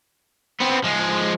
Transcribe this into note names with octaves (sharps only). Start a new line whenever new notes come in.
B3 C4
F3 G#3